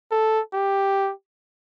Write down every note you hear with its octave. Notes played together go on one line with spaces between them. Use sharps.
A4
G4